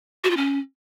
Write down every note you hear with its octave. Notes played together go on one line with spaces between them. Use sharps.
F#4
F4
C#4